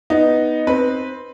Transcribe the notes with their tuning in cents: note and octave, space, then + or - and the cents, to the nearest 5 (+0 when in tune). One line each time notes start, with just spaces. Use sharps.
B3 +0 D#4 +0
C4 +0 B4 -10